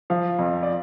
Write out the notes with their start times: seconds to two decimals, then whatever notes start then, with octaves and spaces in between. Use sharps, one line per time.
0.10 F3 F5
0.39 F2
0.63 D5